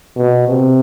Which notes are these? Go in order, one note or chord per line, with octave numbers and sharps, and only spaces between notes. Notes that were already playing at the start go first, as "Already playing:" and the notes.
B2
C3